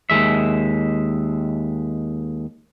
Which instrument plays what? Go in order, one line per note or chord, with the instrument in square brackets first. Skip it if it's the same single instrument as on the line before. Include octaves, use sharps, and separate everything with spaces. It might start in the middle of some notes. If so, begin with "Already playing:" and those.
[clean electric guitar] D#2 F#3 G#3 E5